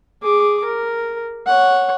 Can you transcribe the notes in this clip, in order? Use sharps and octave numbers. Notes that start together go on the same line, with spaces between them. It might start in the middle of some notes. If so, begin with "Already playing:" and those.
G#4 D6
A#4
C#5 F#5